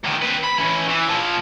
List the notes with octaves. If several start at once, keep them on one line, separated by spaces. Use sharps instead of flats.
D2 D#3
C4 B4
B5
E3 C#4
E3
A#2 F3